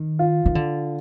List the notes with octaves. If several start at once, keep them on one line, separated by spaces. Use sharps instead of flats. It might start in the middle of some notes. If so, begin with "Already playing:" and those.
Already playing: D#3
F4
D#3
D3